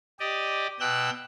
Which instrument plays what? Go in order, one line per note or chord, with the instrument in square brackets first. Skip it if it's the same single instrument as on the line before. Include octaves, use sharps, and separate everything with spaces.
[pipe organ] G4 D5 D#5
B2 G5 E6 F#6 G6